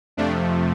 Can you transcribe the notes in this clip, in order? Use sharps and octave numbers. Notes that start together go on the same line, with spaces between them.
F2 C3 F3 A3 D4